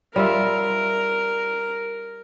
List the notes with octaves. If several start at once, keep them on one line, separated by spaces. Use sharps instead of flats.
G3 F4 A#4 E5